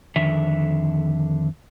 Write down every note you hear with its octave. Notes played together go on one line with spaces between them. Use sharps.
F2 D3 D#3 E5